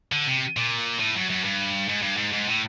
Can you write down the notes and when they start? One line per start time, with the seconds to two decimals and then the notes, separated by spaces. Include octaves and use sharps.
0.12 D3
0.27 C3
0.57 A#2
1.00 A2
1.16 F#2
1.30 F#2
1.45 G2
1.89 G#2
2.02 G2
2.17 G#2
2.33 G#2
2.48 A2